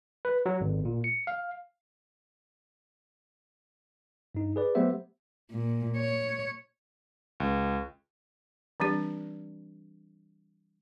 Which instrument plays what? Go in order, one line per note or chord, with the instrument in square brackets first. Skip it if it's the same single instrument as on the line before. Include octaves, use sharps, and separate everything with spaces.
[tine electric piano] B4
F#3
G#1
A#2
C#7
F5
G2 D#4
G#4 B4 D5
F#3 A3 B3 G4 C5 E5
[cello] A#2
C#5
[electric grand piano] C#2
[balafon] E3 G3 C4 D4 G4 D5